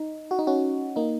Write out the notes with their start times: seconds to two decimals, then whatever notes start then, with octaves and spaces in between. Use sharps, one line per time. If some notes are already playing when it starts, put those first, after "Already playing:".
Already playing: D#4
0.31 F#4
0.39 D#4
0.47 C#4 F#4
0.96 A#3 D#4